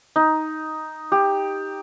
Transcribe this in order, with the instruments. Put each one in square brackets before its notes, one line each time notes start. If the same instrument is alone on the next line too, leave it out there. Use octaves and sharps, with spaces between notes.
[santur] D#4
G4